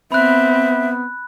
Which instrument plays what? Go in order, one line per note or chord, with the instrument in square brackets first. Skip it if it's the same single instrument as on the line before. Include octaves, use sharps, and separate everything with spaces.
[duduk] B3 [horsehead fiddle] C4 [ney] E5 [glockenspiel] B5 F#6